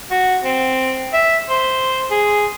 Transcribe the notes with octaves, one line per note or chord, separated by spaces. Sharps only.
F#4
C4
E5
C5
G#4